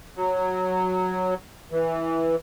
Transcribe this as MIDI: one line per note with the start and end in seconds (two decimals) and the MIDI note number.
0.16 1.34 54
1.71 2.35 52